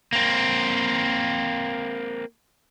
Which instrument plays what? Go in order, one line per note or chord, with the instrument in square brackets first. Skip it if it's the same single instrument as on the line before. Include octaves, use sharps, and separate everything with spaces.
[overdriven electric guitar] A#3 C4